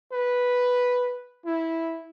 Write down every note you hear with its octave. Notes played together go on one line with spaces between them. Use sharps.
B4
E4